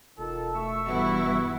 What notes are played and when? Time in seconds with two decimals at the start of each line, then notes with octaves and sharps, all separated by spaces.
0.18 E1 D#3 F4 A4
0.54 A3 E5 C#6 E6
0.88 G2 E3 B3 E4 F#4